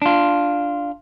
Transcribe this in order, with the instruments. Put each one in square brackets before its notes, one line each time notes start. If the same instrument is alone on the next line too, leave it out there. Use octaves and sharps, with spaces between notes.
[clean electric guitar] D4 F4